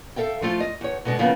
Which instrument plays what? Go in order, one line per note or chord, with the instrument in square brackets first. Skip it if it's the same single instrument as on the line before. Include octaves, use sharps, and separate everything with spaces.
[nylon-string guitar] A4 E5 F5 G5
F3 A3 F4
D#5
E2 C#5
B2 D3 G#3
C#3 F3 A#3 B3